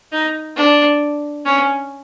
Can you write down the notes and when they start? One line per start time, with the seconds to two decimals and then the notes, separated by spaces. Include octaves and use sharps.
0.12 D#4
0.56 D4
1.45 C#4